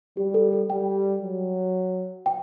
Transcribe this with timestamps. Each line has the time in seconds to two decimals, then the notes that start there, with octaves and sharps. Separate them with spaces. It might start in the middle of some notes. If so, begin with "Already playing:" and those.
0.17 G3 G4
0.34 A4
0.53 A4
0.70 G3 G5
1.22 F#3
2.26 G5